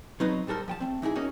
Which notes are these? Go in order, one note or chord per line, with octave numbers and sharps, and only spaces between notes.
F#3 C4 D#4 B4
A#2 G3 A4 A#4 C5
F3 G5 A5
A3 C4
E3 D#4 E4 G#4
A#3 C#4 D#4 F#4